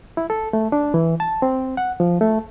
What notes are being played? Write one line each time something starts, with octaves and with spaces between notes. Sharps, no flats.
E4
A4
A3
D4
E3
A5
C4
F#5
F3
A3